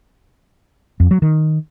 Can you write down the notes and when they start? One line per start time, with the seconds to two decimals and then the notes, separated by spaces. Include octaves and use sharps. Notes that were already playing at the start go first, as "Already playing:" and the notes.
1.00 F2
1.11 F#3
1.22 D#3